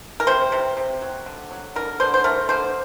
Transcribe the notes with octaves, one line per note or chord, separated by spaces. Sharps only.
A#4
C3 C5
C3
C3
F#3
D3
F#3
D3 A#4
D3 C5
C5
A3 A#4
D3 C5